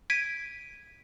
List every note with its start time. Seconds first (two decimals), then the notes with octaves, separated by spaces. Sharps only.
0.10 G#6 B6 D7 D#7